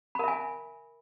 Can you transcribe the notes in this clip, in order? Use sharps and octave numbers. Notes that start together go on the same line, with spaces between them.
A#4 E5 G#5 B5